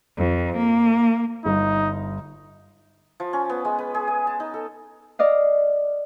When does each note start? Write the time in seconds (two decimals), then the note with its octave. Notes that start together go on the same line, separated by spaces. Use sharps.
0.17 F2
0.57 A#3
1.45 G1 D#4
3.20 F3
3.33 C#4
3.50 B3
3.65 G#3
3.79 B4
3.95 G#4
4.08 G#5
4.27 A5
4.40 D#4
4.54 A4
5.19 D5 D#5 F5